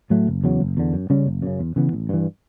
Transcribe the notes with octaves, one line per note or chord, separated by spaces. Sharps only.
A2 F#3 A3
F#1
E2 C#3 F#3
F#1
E2 D3
F#2
C#3 G3 C#4
F#1
F#2 C#3
E2
C#3 E3 B3
A1
G2 E3